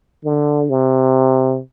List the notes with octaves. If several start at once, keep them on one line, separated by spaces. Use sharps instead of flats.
D3
C3